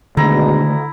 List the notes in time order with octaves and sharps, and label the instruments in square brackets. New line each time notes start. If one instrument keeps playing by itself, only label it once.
[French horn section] B2 G#3 D4 [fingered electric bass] D3 D#3 A3 [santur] E4 A#5